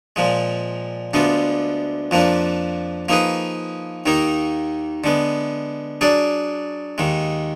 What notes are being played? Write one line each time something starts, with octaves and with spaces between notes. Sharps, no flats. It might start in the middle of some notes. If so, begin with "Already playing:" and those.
A#2 F3 G#3
D2 D3 G#3 B3 F4
F2 F3 A#3 D4
F3 A#3 D#4 G#4 B4
D#2 D#3 A#3 D#4
D3 G#3 B3
F#3 D4 G#4 D5
D#2 D#3 G#3